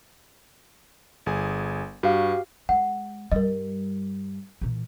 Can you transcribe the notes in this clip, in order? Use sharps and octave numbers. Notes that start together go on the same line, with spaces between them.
G1 G#4 G#5
G2 F#4 G4 F5
G#3 F#5
G2 G3 A#4 D#5
A#2 E3